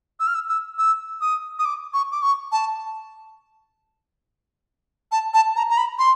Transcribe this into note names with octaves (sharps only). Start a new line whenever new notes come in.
E6
F6
E6
E6
E6
D#6
D#6
D6
C#6
D6
C#6
A5
A5
A5
A#5
A#5
B5
C6